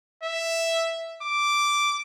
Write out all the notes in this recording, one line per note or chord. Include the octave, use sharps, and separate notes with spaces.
E5
D6